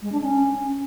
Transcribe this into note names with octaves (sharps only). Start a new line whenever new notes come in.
G#3
D4
C#4